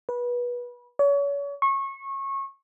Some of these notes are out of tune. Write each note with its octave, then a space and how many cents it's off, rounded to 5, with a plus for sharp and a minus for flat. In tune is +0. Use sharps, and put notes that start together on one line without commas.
B4 -25
C#5 +35
C#6 -25